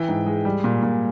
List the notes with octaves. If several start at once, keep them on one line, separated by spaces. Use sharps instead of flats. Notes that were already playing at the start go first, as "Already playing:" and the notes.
Already playing: E3 G5
G#2
G#3
G3
A#2
A#2